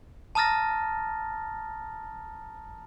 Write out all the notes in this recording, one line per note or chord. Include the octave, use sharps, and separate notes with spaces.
A5 A#5 D#6 F6 A6 A#6